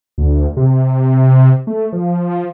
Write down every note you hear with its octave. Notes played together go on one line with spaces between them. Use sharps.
D2
C3
A3
F3